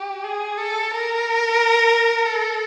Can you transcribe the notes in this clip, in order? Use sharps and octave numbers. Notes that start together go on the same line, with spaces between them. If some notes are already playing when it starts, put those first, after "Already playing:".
Already playing: G4
G#4
A4
A#4
A4